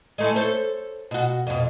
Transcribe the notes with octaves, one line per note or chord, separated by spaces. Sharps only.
G#3 A3 E4
A4 C5 C#5
B2 F#4
F2 B2